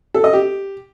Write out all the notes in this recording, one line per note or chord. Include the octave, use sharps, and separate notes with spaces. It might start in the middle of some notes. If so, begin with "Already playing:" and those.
A4
D#5
G4